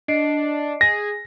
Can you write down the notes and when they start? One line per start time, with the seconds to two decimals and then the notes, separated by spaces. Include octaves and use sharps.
0.08 D4 D#5 C7 D7
0.81 G#4 A#6